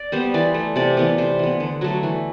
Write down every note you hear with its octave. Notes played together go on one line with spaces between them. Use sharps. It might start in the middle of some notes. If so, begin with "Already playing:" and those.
Already playing: D5
G3 B3 C5
E3 D5
A3
C3 D5
E3 B3 D5
C3 C5
E3 B3
D3
F#3 A3
E3